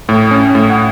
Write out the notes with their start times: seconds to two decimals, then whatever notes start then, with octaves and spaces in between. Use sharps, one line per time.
0.09 A2
0.31 C#4
0.55 A2
0.70 F#5